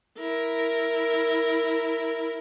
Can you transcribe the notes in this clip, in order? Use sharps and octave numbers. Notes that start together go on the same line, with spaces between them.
E4 A#4